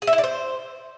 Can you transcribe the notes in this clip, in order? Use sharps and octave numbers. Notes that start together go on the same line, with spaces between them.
G#4
E5
E4
D5
C5